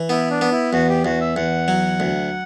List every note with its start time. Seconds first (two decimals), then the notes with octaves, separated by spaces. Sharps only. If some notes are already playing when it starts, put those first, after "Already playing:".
Already playing: E3
0.09 B3 E4
0.31 D4
0.41 B3
0.52 E4
0.73 E2 F#4
0.89 G4
1.05 E2 F#4
1.21 E5
1.36 E2 F#5
1.68 F#3
2.00 D2